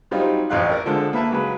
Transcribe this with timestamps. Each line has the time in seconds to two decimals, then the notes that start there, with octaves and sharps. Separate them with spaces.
0.11 F#3 G3 C4 D#4 F4
0.50 A1 F2 F5 F#6
0.69 A#4 D5
0.86 D3 F3 G#3 A4
1.13 A#3 B4 E5 A5
1.31 C#3 F#3 G#3 B4